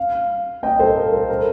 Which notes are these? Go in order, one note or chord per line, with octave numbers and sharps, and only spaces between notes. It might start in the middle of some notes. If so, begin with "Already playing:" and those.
Already playing: F5
D#5 G5
A4 C5
A#4
A4
A#4